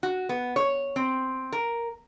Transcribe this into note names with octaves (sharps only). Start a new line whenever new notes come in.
F#4
B3
C#5
C4
A#4